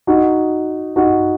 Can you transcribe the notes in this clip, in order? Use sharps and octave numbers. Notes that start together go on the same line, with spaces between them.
D#4 F#4
D#4 F#4